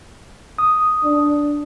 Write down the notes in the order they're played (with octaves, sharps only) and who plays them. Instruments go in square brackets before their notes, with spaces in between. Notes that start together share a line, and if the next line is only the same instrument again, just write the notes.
[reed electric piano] D#6
[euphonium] D4